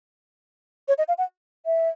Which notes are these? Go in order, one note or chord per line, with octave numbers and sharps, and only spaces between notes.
C#5
D#5
F5
F#5
E5